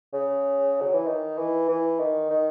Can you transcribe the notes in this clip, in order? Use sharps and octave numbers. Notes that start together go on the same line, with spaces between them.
C#3
F#3
E3
D#3
E3
E3
D#3
D#3